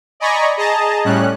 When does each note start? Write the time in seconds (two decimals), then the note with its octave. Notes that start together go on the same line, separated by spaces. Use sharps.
0.20 D5 D#5 G#5 A#5 B5 C#6
0.57 G#4 D#5 A5 A#5
1.04 A2 G3 C#4 F#6